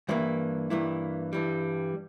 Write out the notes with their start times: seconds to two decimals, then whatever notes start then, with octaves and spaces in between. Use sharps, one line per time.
0.09 G2 E3 A#3 E4
0.70 G2 E3 A#3 E4
1.33 G2 E3 G3